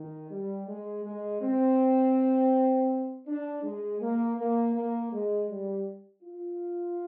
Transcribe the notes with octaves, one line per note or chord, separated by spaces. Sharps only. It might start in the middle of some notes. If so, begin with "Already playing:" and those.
Already playing: D#3
G3
G#3
G#3
C4
D4
G#3
A#3
A#3
A#3
G#3
G3
F4